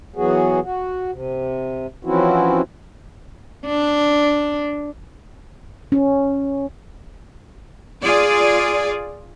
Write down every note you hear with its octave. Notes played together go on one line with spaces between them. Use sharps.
E3 F#3 B3 F#4 G#4
F#4
C3
E3 F3 C4 C#4 E4 F#4
D4
C#4
F4 G#4 D5